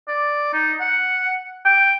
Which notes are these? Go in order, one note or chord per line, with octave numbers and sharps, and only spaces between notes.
D5
D#4
F#5
G5